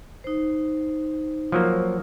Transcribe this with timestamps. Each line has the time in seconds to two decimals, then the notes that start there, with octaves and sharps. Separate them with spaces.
0.24 D#4 C5
1.52 F3 F#3 A#3